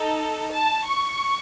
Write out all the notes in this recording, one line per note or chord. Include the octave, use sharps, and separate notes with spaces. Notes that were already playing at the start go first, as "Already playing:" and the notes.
Already playing: D#4 A4
A5
C#6